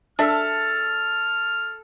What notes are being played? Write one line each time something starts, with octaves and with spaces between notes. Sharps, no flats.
D4 A4 E5 F6